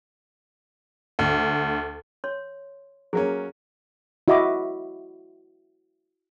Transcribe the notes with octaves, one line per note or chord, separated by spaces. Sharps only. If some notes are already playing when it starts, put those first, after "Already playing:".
D2
C#5 C6
F#3 A#3 C#4 G#4
E4 F#4 D#5 E5 B5 D6